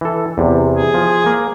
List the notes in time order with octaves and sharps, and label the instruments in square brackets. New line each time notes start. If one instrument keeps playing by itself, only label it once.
[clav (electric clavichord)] E3 A4
E2 C3
[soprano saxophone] G#4
[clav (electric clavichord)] F3
A#3